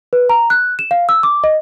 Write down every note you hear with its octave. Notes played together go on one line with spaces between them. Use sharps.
B4
A#5
F#6
E7
F5
E6
D6
D#5